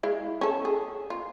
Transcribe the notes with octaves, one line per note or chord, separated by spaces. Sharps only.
G#3 E4 F5
C#4 A4
G#4
F4